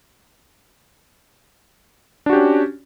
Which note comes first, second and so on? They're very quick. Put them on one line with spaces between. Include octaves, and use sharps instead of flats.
D4 F#4 G4 C#4